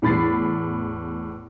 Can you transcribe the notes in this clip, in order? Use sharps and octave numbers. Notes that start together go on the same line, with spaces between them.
E2 A2 B5 A6 C7